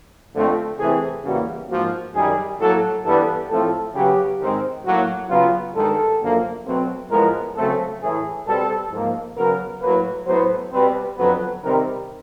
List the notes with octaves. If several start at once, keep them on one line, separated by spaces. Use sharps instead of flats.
F2 D3 F3 A3 C4
C3 E3 A3 C4 G#4
E2 C#3 E3 G3 A#3 F#4
G#2 F3 A#3 F#4
F#2 D#3 G3 G#4
A2 F#3 A#3 A4
G2 E3 G3 B3 A4
A2 F3 A3 C4 A4
C#3 F#3 B3 G4
G#2 D#3 G#3 C4
A2 F#3 A#3 F#4
C#3 F#3 B3 F4
G2 D#3 G#3 A4
F#2 D3 F3 A#3
B2 F#3 A3 C4
A2 F3 G#3 B3 A#4
C#3 F#3 A3 C4 A4
A2 E3 A3 G#4
B2 G3 C4 A4
G#2 F3 A#3
C#3 F#3 B3 A#4
A2 F#3 A#3 B4
A2 F#3 B3 C5
B2 G3 C4 B4
F2 D3 F#3 B3 B4
C3 D#3 G3 C4 A#4